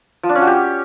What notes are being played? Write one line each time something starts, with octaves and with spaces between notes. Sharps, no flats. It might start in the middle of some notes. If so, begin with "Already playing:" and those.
F3
D4
C#4
F#4
G4